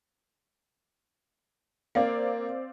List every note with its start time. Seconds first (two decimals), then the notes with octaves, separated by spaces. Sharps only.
1.95 A#3 C4 D5 F5